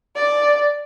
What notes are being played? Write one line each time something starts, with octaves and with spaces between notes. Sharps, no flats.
D5